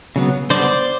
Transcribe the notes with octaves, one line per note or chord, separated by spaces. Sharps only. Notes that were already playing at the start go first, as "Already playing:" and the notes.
C#3 F#3 B3
D3 G3 B3 C5 D5